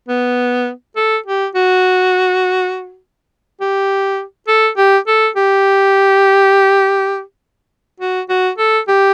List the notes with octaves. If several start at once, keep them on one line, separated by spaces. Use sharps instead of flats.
B3
A4
G4
F#4
G4
A4
G4
A4
G4
F#4
F#4
A4
G4